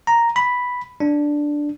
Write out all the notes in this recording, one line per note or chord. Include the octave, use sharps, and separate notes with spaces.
A#5
B5
D4